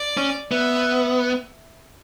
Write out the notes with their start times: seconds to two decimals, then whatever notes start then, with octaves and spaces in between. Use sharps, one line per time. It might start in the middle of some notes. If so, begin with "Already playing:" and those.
Already playing: D5
0.17 C#4
0.51 B3 E5